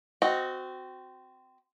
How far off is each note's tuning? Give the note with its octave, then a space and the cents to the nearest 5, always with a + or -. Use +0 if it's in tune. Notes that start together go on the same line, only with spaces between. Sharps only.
C4 -20 F#4 +0 D#5 +0